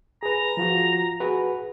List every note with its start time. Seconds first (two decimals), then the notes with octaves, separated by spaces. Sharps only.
0.23 G#4 B4 A#5
0.57 F3 F4 F#4
1.20 F#4 G#4 B4